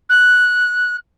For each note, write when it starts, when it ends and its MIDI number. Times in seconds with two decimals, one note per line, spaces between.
0.09 0.96 90